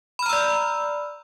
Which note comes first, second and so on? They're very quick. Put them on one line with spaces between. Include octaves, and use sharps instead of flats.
B5 F6 A#5 E6 D5